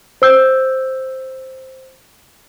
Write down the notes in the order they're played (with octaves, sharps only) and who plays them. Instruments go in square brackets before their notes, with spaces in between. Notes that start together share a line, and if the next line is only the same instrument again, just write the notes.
[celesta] C5 E6 G6